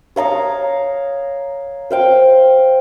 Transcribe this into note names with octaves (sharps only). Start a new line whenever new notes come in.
C#5 F5 A#5 D#6
C5 F5 G5